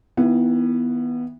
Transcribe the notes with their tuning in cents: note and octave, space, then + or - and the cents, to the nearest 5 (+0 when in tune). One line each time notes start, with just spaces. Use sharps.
D#3 +30 B3 -10 E4 +25